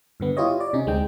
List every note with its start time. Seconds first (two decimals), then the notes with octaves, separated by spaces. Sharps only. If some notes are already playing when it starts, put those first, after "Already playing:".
0.20 G2 D3 B3
0.37 E4 F4 G4 C#5 D#5
0.60 D5
0.73 C3 C#4 D#4
0.86 D2 G#3 C4 D#4 G5